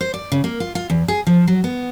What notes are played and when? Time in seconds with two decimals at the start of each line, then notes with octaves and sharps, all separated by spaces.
0.01 C5
0.14 D5
0.32 C#3
0.44 A#3
0.60 F4
0.75 F4
0.90 E2
1.08 G#4
1.27 F3
1.47 F#3
1.64 B3